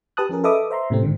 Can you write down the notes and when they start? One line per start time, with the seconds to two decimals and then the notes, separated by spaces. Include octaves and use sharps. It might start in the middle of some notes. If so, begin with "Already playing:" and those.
0.17 G4 B4 A5 D#6 F#6
0.29 F3 C#4 G#4 A#4
0.44 A4 B4 D#5 E5 D6 D#6
0.70 C5 E5 A#5 C6
0.90 A2 C3 A3 C4
1.03 G#2 D3 D#3